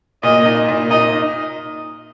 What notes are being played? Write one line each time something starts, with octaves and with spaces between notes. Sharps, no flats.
A#2 D#5
D#4
A#2
D#4 D#5